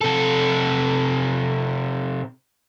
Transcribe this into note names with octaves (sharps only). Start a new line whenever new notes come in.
C3 A4